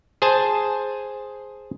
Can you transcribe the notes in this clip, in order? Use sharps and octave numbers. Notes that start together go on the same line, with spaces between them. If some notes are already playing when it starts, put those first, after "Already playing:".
G#4 C5 G#5 A5